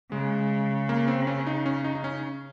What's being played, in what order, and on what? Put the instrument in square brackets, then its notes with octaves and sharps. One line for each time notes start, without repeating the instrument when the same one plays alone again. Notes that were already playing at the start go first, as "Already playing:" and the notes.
[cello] C#3 [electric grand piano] G#3
[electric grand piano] A#3
C4
C#4
D#4
C#4
D#4
D#4
C#4